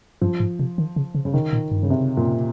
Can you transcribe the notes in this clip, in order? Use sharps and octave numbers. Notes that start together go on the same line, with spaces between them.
G2 F3
G#2
C3
D#3
C#3
C#3
C#3
C3 D#3
A#2
G2
C#3
C3
A#2